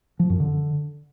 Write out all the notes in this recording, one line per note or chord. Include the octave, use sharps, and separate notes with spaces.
F3
F#2
D3